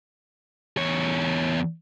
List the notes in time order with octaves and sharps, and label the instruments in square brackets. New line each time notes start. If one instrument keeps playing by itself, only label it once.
[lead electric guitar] E2 C#5